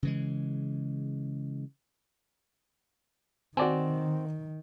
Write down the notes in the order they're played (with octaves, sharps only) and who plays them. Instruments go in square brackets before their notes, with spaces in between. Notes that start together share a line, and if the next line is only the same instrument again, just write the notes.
[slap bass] C#3 E3 G#3
[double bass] D#3 [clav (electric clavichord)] C4 [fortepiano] F#4 D5 G#5